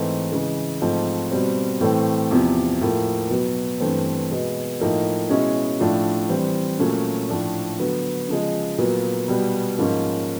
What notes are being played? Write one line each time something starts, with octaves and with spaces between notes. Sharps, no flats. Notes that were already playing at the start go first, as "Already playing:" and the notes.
Already playing: G#2 E3 A3 C4
C#3 E3 G#3
G#2 F3 A3 C4
B2 G3 C4
A2 E3 A3 C4
E2 C3 F3
A2 F3 A#3
B2 F#3 B3
G2 E3 A3 C4
B2 G#3 B3
A2 F3 A#3 D#4
B2 G#3 C#4 E4
A2 F3 A3 D4 F4
E3 G3 C4
A#2 F#3 A3 C#4
A2 F3 A3 D4
D3 F#3 B3
C#3 F3 G#3
A#2 F#3 B3
B2 G3 B3
G#2 F3 A#3 C#4